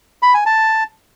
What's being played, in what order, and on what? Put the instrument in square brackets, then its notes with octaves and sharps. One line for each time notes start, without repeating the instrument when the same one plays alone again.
[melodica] B5
G#5
A5